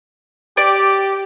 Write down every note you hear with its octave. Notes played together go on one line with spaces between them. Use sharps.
G4 D5